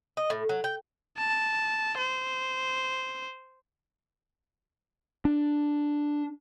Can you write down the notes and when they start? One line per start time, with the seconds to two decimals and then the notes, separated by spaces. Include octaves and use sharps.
0.17 D#5
0.30 A2
0.49 F#3
0.64 G5
1.17 A5
1.98 C5
5.25 D4